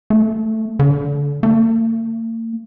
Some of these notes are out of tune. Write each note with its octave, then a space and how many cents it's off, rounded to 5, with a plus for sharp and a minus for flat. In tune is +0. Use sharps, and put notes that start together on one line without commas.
A3 +5
D3 -30
A#3 -45